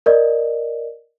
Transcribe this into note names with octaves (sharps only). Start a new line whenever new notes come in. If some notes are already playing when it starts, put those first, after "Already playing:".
A#4 D5 D#5